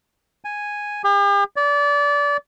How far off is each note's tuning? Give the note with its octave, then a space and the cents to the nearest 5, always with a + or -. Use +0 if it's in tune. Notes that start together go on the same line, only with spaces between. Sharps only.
G#5 -5
G4 +45
D5 -25